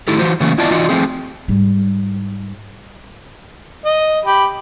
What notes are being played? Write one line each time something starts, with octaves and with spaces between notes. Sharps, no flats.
A2 D#3 D#4 E4 G4 A4
E3 F#3 F#4 C5
C#3 E3 F#3 A3 A#3 C#4
B3 E4 F4 D5 D#5 A5
E3 D#4 F4 F#4 D5 D#5
F3 A3 C4 G#4
G#2 G3
D#5
G4 B5